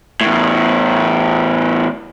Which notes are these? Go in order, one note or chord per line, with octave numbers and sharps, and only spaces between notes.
E2 A2